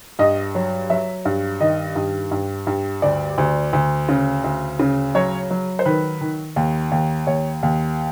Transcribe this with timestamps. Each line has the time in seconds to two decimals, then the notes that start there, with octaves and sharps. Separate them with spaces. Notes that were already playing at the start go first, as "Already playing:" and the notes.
0.19 G2 D#5
0.55 F#3
0.90 F#3 E5
1.25 G2
1.60 D#3 D#5
1.96 G2
2.31 G2
2.67 G2
3.02 D2 D5
3.38 D2
3.73 D2
4.09 C#3
4.44 D2
4.79 C#3
5.15 F#3 C#5
5.50 F#3
5.79 C5
5.85 D#3 B4
6.21 D#3
6.56 D#2
6.92 D#2
7.27 D#2 C#5
7.63 D#2